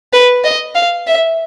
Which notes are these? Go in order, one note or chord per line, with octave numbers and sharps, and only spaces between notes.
B4
D#5
F5
E5